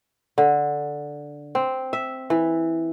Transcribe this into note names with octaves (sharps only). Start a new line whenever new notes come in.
D3
C4
E5
E3